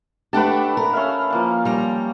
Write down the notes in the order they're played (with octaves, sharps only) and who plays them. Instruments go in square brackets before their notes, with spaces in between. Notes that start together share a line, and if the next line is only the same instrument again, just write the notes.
[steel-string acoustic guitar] A3 D4 G4 [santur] B4 F#5 A5
[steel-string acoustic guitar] A#4
[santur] C#4 E5 F5
F3 A#3 F5
[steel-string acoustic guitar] G3 A#5